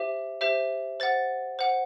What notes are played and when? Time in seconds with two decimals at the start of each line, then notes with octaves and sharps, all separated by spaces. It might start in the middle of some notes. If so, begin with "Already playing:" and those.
Already playing: G4 C5 E5
0.41 G4 C5 E5
1.00 C5 F#5 A6
1.59 C5 F#5